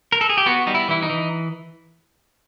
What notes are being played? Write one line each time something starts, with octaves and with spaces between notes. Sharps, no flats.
A#4
A4
G#4
G4
B3 F#4
G3 D#4
E4
E3 E4
D#4
E3